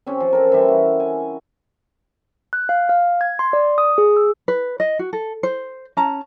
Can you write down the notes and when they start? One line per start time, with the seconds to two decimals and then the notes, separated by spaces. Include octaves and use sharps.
0.06 C4 C#4 G4
0.20 F3
0.33 A4 A#4
0.52 E3 G3 G4 E5
0.68 F#4
1.00 G#5
2.53 F#6
2.69 F5
2.89 F5
3.21 G#6
3.39 C6
3.53 D5
3.78 D#6
3.98 G#4
4.17 E6
4.48 B4
4.80 D#5
4.99 F#4
5.13 A4
5.43 C5
5.97 C#4 A5 A#5